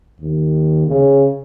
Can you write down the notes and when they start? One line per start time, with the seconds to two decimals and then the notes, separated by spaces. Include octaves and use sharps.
0.21 D#2
0.87 C#3